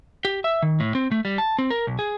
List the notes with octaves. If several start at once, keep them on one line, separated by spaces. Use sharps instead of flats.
G4
E5
D#3
A2
C4
A3
G3
A5
C4
A#4
B1
G#4